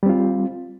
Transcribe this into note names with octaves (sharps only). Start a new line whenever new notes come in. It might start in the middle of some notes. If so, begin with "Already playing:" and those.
G3 C4 F4